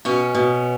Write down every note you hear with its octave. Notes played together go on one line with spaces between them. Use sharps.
B2 C#4
B2